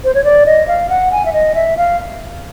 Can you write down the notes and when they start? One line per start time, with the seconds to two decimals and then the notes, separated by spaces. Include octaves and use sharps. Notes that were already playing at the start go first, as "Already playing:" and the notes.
0.04 C5
0.15 C#5
0.24 D5
0.46 D#5
0.68 F5
0.89 F#5
1.12 G#5
1.25 E5
1.33 D#5
1.55 E5
1.77 F5